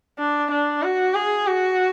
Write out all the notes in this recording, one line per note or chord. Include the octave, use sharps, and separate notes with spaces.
D4
D4
F#4
G#4
F#4